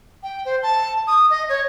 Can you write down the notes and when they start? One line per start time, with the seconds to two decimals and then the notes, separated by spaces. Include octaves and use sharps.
0.23 G5
0.45 C5
0.63 A5
1.07 D#6
1.30 D#5
1.49 C#5